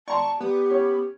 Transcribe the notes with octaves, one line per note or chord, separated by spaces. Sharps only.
D5 A5 A#5 C6 C#6
B3 G4
C#4